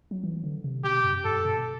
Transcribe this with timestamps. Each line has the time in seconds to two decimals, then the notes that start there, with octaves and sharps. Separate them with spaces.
0.11 F#3
0.24 E3
0.44 D3
0.64 C3
0.84 B2 G4
1.04 F#2
1.24 G2 A4
1.45 B2